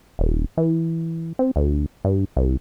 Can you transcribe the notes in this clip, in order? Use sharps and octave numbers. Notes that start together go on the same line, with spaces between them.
D#1
E3
C4
D2
G2
C2